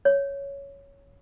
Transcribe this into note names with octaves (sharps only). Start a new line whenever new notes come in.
C#5